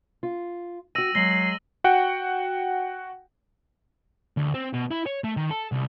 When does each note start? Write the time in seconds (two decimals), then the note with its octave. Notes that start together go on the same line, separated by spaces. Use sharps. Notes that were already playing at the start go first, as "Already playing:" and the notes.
0.23 F4
0.95 F#4 G5 E6 A#6 D#7
1.15 F#3 G#3 A#6 C7 F#7 G7
1.84 F#4 F#5 G5
4.37 D2
4.54 C4
4.73 B2
4.91 E4
5.06 C#5
5.24 A3
5.37 D#3
5.50 A4
5.72 C2